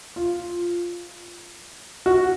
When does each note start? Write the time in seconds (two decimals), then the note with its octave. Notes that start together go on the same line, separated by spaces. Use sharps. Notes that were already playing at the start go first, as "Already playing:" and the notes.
0.16 F4
2.06 F#4